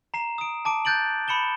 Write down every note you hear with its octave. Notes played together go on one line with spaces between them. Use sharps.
A#5 C7 E7
D#6 D7
A5 D6 D7
F#6 G6 A6 D7 F#7
B5 C#7 E7 G7